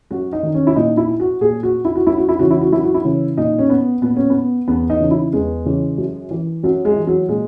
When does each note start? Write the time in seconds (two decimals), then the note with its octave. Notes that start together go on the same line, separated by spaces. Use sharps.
0.11 F#2 F#4
0.33 D#4
0.43 D#3
0.54 C#4
0.67 E4
0.76 A#2 D#4
0.97 E4
1.20 F#4
1.41 A#2 G#4
1.63 F#4
1.85 E4
1.95 F#4
2.06 F#2 E4
2.18 F#4
2.29 E4
2.39 C#3 E3 F#4
2.51 E4
2.61 F#4
2.72 F#2 E4
2.84 F#4
2.94 E4
3.04 C#3 E3
3.37 A#2 D#4
3.58 C#4
3.70 B3
4.02 A#2 B3
4.16 C#4
4.30 B3
4.68 E2 B3
4.90 D#4
5.00 C#3 E3
5.11 E4
5.33 E2 G#3
5.65 C#3 E3
5.98 F#2
6.31 E3
6.63 F#2 F#3
6.85 G#3
6.96 E3
7.07 F#3
7.29 A#2 G#3